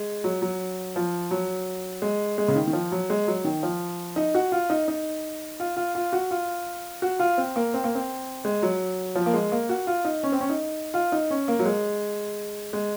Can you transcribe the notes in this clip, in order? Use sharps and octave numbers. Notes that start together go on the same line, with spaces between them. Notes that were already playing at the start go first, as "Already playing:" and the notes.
Already playing: G#3
F#3
F#3
F3
F#3
G#3
G#3
C#3
D#3
D#3
F3
F#3
G#3
F#3
D#3
F3
D#4
F#4
F4
D#4
D#4
F4
F4
F4
F#4
F4
F#4
F4
C4
A#3
C4
A#3
C4
G#3
F#3
F3
A#3
G#3
A#3
F#4
F4
D#4
C#4
C4
C#4
D#4
F4
D#4
C#4
A#3
F#3
G#3
G#3